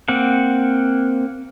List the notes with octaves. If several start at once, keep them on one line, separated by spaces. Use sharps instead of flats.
A#3 C4 F#5